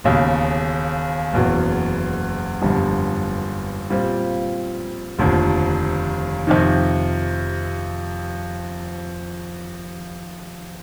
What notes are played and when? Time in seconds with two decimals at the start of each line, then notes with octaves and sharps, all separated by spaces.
0.04 E1 D#2 C#3
1.33 F#1 E2 B2 F#3
2.62 G1 F2 D3 G3
3.90 A#2 G3 C4 F4
5.19 F1 D#2 D3 F3
6.47 F2 C3 D#3